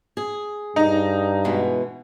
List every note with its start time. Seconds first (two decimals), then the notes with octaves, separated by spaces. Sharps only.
0.17 G#4
0.76 G2 D#4
1.45 B2 E3 G#3